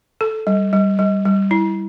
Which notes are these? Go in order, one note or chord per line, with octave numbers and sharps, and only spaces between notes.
A4
G3
G3
G3
G3
E4